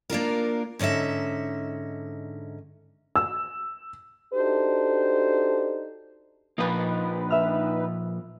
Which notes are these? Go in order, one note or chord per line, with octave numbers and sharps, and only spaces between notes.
A#3 D4 F4 A#4
G#2 D3 C#4 D#4 E5
E6
D4 D#4 F#4 G4 A4 C5
A#2 F3 A#3 D#4 B4
E5 F6